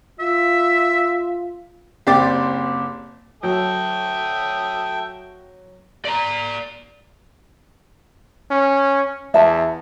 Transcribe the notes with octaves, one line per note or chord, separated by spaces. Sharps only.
F4 E5
F#1 C4 G4 D5 D6 A6
F#3 A4 E5 G5 D#6
D5 A#5
C#4
E2 E5 A5